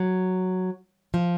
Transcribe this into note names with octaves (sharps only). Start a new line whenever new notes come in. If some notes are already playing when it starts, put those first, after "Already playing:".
Already playing: F#3
F3